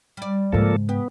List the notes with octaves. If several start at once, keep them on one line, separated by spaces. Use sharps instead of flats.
G3 D5
G#2 C#3 F3 A#3 A4
B3 G4